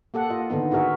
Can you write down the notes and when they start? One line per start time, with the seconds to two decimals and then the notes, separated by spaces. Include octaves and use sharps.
0.14 A#3 G4 A4 F#5
0.30 F4 D#5
0.50 D3 D#3 B3 D#4
0.71 E4 F#4 G#4 A#4 E5